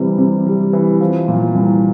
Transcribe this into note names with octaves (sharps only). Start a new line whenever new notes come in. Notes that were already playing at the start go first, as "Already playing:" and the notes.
Already playing: C3 E3 G3
C3
G3
E3
F3
A#2
C2